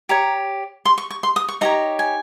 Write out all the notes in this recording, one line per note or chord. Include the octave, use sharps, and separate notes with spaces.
G4 C#5 A#5
C6
C#6
C#6
C6
D#6
C#6
D#4 G4 C#5 A#5
G#5